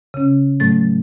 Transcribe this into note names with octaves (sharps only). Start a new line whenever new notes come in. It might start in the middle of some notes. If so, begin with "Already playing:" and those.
C#3 C#4
A2 F#3 A3 A6